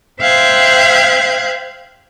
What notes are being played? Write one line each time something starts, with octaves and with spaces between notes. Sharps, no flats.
C5 E5 F5 G5 F#6 G#6